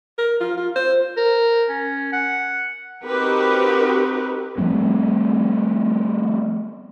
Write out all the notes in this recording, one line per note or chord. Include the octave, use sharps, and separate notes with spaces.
A#4
F4
F4
C5
A#4
C#4
F#5
C4 D#4 F#4 G4 A#4 B4
F3 G3 A3 C4